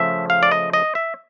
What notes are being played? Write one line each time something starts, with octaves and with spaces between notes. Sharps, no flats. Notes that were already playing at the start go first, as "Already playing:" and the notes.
Already playing: C#3 F3 A3 E5
F5
D5
D#5
D#5
E5